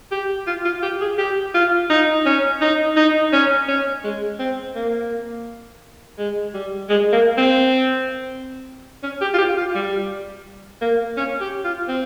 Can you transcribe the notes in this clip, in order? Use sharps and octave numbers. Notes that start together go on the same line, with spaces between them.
G4
F4
F4
G4
G#4
G4
F4
D#4
C#4
D#4
D#4
C#4
C#4
G#3
C4
A#3
G#3
G3
G#3
A#3
C4
C#4
G4
F4
G4
F4
G3
A#3
C#4
G4
F4
C4